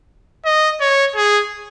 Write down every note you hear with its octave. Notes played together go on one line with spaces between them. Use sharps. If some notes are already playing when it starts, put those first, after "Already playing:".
D#5
C#5
G#4